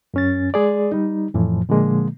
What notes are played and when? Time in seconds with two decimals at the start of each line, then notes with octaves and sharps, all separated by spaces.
0.14 F#2 C#4 A6
0.54 G#3 G#4 D5
0.92 G3 D#4
1.34 F2 A2 E3 F3
1.69 A#2 D3 F3 G#3 A#3